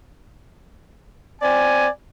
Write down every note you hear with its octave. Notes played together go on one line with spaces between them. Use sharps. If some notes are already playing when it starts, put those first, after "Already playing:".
C4 D5 G#5